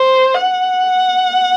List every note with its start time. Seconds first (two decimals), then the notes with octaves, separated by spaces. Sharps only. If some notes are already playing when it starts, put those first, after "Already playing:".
Already playing: C5
0.34 F#5